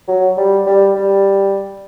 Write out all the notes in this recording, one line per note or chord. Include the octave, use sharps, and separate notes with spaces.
F#3
G3
G3
G3